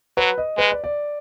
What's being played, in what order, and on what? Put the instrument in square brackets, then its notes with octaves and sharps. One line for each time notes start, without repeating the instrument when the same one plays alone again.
[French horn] F#3 [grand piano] B4
[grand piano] D#5
[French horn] G#3 [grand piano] B4
[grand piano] D5
D5